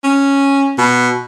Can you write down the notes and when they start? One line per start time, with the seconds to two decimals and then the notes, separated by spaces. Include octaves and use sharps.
0.04 C#4
0.78 B2